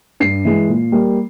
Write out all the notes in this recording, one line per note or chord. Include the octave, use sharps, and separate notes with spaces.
G2 C7
E3 G#3
A#2
G3 A#3